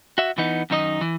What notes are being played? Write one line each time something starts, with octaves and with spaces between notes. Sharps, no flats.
F#4 E5
E3 B3 D#4
F#2 D#3 D#4 D#5
E3